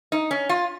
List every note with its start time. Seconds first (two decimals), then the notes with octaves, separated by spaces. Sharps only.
0.12 D#4
0.31 C#4
0.49 F4